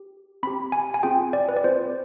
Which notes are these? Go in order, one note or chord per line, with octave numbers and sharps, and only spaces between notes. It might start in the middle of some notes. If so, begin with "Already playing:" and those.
Already playing: G4
C4 G4 B5
G#5
G#5
C4 F4 G#4 G5
D5
B4
D5
C4 F4 G#4 C5